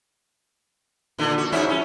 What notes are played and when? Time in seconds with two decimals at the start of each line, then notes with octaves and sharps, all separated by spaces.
1.18 A#2 D3
1.38 F#4
1.52 G#2 C#4 E4
1.69 C#4